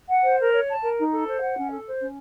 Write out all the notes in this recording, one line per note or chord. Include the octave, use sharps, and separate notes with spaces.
F#5
C5
A#4
C#5
A5
A#4
D#4
A4
C5
F#5
C#4
A4
C5
C#4